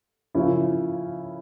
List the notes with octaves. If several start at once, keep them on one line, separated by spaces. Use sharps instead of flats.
C#3 F3 A#3 C#4 E4